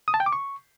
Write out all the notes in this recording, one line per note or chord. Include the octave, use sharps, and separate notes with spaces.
D#6
A5
G5
D6
C#6